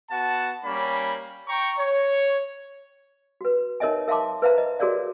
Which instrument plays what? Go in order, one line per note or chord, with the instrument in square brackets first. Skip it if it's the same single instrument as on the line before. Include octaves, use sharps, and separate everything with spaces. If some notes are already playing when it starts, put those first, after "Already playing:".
[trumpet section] B3 F#4 F#5 A5
G3 A#3 C#4 B5
G5 A#5 C#6
C#5
[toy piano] F#4 B4
D#4 A#4 C#5 D#5 E5 G#5
A#4 E5 F5 A5 C6 D6
B4 C5 E5 F5 A#5
D#5
F#4 G#4 A#4 C#5 D5 F5